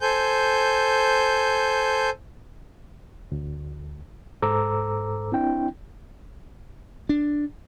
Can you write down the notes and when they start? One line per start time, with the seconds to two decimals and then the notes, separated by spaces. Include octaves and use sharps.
0.01 A4 C5 G#5 G6
3.32 D2
4.42 G#2 A4 C5 A#5 D6 E6
5.32 C4 D4 E4 G5
7.09 D4